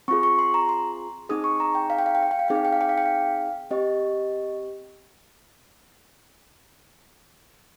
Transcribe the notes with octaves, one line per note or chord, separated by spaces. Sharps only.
C4 F4 G#4 C#6
C#6
C6
A#5
C6
C4 D#4 G#4 D#6
C#6
A#5
G5
F5
G5
F5
G5
F5
G5
F5
C4 D#4 G#4 G5
F5
G5
F5
G5
F5
G5
F5
C4 G4 D#5